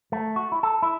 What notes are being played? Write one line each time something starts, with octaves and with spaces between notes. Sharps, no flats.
A3
F#4
E4
A4
E4